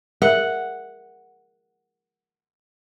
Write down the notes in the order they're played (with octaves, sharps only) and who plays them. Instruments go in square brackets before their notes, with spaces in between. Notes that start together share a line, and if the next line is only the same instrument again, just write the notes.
[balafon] G#4 A#4 E5 [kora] F#5